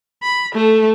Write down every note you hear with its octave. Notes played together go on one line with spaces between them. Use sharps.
B5
A3 A4